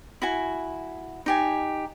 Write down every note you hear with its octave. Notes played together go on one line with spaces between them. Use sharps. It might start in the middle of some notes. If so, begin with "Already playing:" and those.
E4 F#4 G#5
D#4 G4 G#5